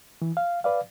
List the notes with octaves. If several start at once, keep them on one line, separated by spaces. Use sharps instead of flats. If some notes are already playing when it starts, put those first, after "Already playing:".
E3
F5
B4 D5 F5